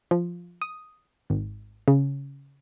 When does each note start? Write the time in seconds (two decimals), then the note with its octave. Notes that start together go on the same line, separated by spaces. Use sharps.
0.11 F3
0.62 D#6
1.30 G#1
1.88 C#3